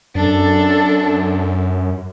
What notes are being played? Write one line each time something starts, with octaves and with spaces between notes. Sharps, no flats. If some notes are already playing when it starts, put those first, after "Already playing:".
F#2 D4 A4